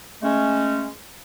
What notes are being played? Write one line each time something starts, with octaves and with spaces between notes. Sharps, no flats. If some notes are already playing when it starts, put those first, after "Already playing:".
G#3 A3 C#4